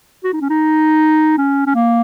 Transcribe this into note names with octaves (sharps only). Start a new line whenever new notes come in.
F#4
D#4
C#4
D#4
C#4
C#4
A#3